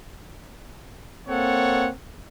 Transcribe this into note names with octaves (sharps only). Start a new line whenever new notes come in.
A#3 C4 A4 C#5 F#5